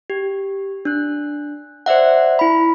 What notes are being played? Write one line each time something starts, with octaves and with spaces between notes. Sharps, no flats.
G4
D4 F#6
C5 D5 E5 F#5
E4 B5